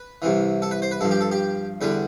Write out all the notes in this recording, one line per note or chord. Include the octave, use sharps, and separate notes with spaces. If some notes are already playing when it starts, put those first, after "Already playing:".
Already playing: B4
C2 C3 E3
A4
B4
C5
B4
G2 F3 A4
G4
A4
G4
E2 D3 G3 B4